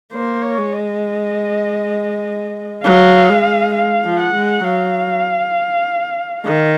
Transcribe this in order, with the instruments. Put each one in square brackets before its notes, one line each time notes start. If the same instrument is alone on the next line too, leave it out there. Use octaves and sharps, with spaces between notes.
[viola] A#3 [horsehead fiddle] C5
[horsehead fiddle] C#5
[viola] G#3
[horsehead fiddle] D#5
[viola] F#3 [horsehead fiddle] F5
[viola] G#3
[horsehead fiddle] F5
[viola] F3
[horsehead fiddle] F#5
[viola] G#3
[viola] F#3 [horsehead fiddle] F5
[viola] D#3 [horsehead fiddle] D#5